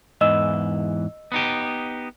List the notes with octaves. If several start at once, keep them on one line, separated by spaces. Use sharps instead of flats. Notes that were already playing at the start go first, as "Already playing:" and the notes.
E2 G#2 E3 D#5 E6 E7
B3 D#4 G4